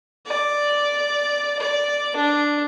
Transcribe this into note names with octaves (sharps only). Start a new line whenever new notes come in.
D5
D5
D4